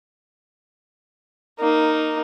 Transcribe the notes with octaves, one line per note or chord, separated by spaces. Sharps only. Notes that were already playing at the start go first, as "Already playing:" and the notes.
A#3 D#4